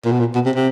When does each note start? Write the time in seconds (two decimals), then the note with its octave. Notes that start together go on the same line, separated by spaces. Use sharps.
0.05 A#2
0.12 B2
0.20 A#2
0.35 B2
0.46 C3
0.56 C3